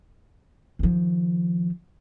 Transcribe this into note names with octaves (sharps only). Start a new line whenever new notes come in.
D#3 F3